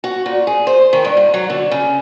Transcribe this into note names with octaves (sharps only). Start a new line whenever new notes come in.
F#4
A#2
G#4
C5
D#3
G2
G#2
F#3
D3
C#3